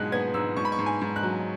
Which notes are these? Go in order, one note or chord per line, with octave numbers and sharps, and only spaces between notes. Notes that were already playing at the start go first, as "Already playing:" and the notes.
Already playing: G#2 B2 G#3 F#6
B3 G#6
G#2 E6
G#2 C#6
B5
C#6
G#2
G#5
G#2
F#6
F#3